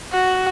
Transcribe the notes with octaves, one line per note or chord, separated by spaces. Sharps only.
F#4